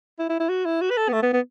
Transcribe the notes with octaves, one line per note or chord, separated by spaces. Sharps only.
E4
E4
E4
F#4
E4
F#4
B4
A4
B3
A3
B3
B3